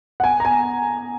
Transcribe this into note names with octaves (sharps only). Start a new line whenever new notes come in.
F#5
G#5
A#5
G#5